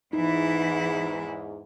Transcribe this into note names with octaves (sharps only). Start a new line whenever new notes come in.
E2 G#2 E3 D#4 E4